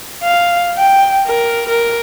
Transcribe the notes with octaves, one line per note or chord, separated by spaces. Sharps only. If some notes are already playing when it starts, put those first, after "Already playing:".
F5
G5
A#4
A#4